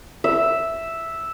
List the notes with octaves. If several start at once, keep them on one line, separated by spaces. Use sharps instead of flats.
E5